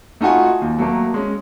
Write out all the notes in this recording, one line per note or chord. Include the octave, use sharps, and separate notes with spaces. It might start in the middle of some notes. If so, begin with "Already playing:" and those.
A3 D#4 F4 F#4 G#5
D#2
F#3 A3 A#3
G#3 C#4